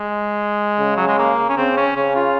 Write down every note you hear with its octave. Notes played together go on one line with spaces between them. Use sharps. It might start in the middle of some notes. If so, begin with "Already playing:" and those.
Already playing: G#3
C#3
F#3
G#3
A#3
C#4
C#3 C4
C#4
C#3 C#4
F4